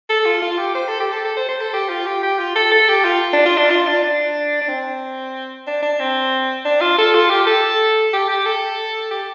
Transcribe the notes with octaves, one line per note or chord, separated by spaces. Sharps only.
A4
F4
F4
G4
C5
A4
G4
A4
A4
C5
C5
A4
G4
F4
G4
G4
F4
A4
A4
G4
F4
D4
F4
D4
F4
D4
D4
D4
C4
D4
D4
C4
D4
F4
A4
F4
G4
A4
G4
G4
A4
G4